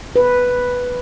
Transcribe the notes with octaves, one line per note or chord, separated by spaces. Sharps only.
B4